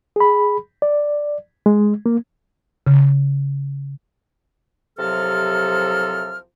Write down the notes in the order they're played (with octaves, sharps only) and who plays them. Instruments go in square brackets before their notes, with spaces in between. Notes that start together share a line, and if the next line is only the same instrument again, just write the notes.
[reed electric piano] G#4 B5
D5
G#3
A#3
[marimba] C#3
[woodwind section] C2 C3 F3 F#3 A4 F6